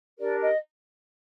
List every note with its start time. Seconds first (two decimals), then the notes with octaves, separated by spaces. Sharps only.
0.19 D4 G4 A#4 D5
0.40 D#5